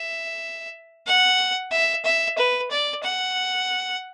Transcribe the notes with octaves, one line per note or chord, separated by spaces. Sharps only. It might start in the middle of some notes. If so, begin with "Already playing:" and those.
Already playing: E5
F#5
E5
E5
B4
D5
F#5